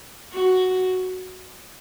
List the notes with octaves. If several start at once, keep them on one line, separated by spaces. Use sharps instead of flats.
F#4